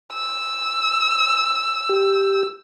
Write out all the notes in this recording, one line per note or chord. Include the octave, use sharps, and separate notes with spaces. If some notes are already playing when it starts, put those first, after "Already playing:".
E6
G4